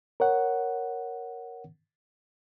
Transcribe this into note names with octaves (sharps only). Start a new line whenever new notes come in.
A#4 C#5 F#5